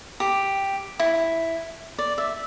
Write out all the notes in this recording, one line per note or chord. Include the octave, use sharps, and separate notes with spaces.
G4
E4
D5
E5